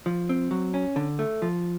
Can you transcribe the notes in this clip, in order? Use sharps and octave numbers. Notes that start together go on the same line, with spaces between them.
F3
C4
F#3
C#4
D3
A3
F3